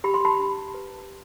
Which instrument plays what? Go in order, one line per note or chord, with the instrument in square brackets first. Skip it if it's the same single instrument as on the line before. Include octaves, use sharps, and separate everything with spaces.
[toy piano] G4 B5
C6
A5 B5
D4
B4